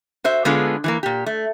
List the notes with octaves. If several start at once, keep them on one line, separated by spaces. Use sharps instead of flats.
F#4 C5 E5
D3 G#3 B3 F4 G#4 A4
E3 G#3 A#3
A#2 G4
A3